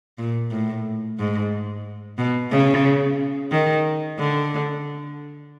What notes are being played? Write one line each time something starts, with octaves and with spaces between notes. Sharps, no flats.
A#2
A2
G#2
B2
C#3
D#3
D3